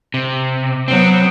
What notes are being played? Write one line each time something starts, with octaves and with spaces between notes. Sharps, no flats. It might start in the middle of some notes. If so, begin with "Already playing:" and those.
C3
F#3 B3 C4